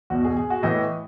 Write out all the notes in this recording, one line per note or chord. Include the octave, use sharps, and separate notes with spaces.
E2 B2 F#4
G#4
G#4
F#4
A2 E3 D#5